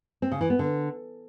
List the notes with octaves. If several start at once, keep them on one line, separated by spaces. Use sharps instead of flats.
C4
C#3
E3
B3
D3